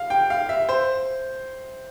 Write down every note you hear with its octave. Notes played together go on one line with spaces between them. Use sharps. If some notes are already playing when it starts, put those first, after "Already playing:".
Already playing: F5
G5
F5
E5
C5